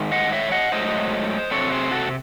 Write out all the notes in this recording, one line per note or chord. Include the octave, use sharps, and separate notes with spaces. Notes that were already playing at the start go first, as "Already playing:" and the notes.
Already playing: G#2 D#3
D#5 F#5
C#5 E5
D#5 F#5
G#2 F#3 A3 C5 D#5
C3 F#3 C4 A4 C#5
G#4 C5
F#4 A4